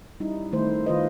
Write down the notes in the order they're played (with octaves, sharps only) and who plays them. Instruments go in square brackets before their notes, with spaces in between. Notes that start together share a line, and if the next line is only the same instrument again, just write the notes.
[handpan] G3 C#4 D#4 E4
D#3 A3 E4 C5
D#3 F4 B4 C5 D#5